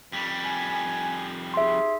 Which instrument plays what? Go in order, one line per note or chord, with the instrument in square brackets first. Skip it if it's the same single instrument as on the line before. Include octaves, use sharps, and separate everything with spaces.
[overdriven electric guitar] F2 G3
[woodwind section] G#5
[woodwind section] D#4 G4 G#4 [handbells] E5 C6